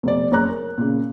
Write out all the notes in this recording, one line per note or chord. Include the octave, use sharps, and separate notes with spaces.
F1 B2 D5
F#1 C#5 A#5 F#6
A#4
A#2 C#3